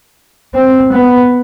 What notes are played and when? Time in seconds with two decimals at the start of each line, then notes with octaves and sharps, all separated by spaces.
0.54 C4
0.92 B3